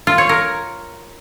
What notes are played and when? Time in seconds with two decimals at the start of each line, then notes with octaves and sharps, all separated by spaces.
0.07 F4
0.18 C#5
0.29 A#4